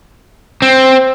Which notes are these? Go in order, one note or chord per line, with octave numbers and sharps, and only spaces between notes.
C4